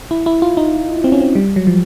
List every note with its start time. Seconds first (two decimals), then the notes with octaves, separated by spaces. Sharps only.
0.11 E4
0.26 E4
0.42 F4
0.57 D#4
1.04 C4
1.12 C#4
1.21 C4
1.35 G3
1.56 F#3
1.67 F3